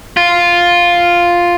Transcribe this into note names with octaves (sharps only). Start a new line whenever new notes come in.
F4